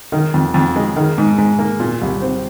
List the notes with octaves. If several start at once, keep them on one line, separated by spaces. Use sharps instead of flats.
D#3
F2
F2
G#3
D#3
G#2
G#2
A#3
A#2
C2
C4